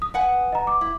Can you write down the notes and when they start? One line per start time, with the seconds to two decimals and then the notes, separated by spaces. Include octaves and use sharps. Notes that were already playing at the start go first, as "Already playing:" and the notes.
0.02 D#6
0.14 B4 F#5 G#5
0.53 D#5 A#5
0.67 D6
0.81 E4